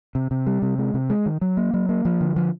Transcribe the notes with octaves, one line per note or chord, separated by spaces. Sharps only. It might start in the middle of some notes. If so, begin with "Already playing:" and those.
C3
C3
G3
C3
G#3
C3
G#3
D#3
F#3
A#3
F#3
A#3
F3
D3
F3